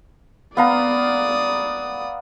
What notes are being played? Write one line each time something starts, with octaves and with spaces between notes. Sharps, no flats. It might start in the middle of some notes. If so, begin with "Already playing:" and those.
B3 D5 F5 A#5 D#6